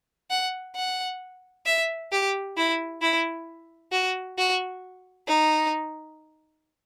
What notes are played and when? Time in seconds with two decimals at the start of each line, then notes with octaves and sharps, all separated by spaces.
0.31 F#5
0.76 F#5
1.67 E5
2.12 G4
2.57 E4
3.02 E4
3.92 F#4
4.38 F#4
5.28 D#4